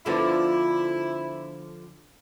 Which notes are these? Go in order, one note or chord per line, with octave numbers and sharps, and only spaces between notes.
D3 F3 B3 E4